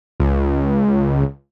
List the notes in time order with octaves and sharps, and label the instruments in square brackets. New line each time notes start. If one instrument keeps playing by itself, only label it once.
[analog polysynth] C#2